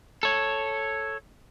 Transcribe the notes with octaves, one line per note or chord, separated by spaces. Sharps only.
A4 C#5